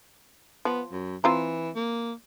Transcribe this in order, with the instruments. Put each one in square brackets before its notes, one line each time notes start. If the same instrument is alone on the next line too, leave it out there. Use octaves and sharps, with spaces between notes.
[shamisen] F3 [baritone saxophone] B3
[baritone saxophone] F#2
[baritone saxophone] E3 [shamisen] C4 F4 A#5
[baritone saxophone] A#3